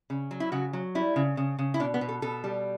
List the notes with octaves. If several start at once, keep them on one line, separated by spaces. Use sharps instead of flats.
C#3
F#3
E4
C#3 F#4
F#3
G3 E4
C#3
C#3
C#3
E4
B2 D4
B3
B2
A4
B2 A4
G3